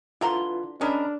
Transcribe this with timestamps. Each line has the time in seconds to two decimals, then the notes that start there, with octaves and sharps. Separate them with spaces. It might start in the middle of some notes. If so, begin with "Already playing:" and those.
0.21 D3 E4 F4 B4 A#5 C6
0.81 G#3 C#4 D4 A#4 B5